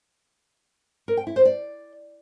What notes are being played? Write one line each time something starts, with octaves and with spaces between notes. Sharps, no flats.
A#4
G5
E4
C5
D5